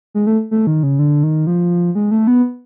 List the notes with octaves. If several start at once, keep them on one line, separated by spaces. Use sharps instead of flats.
G#3
A3
A3
D#3
C#3
D3
D#3
F3
G#3
A3
B3